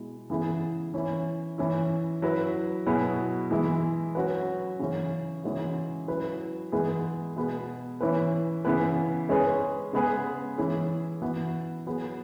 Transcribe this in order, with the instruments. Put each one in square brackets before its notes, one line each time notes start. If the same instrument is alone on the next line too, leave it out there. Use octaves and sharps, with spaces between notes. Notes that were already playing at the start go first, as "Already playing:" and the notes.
Already playing: [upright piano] B2 G#3 E4
C#3 E3 B3 E4 G#4
E3 C#4 E4
E3 C#4 E4
F#3 E4 B4
B2 F#3 B3 E4 G#4
E3 G#3 E4
F#3 C#4 F#4 B4
C#3 E3 C#4
C#3 E3 G#3 C#4 F#4
F#3 E4 B4
E3 G#3 B3 G#4
B2 B3 G#4
E3 C#4 E4 B4
C#3 E3 B3 E4 B4
G#3 C#4 G#4 B4
C#3 G#3 B3 G#4 B4
E3 C#4 E4 G#4
E3 B3 F#4 B4
F#3 B3 G#4